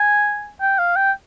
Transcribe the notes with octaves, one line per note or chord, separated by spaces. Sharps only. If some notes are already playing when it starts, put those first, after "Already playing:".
Already playing: G#5
G5
F5
G5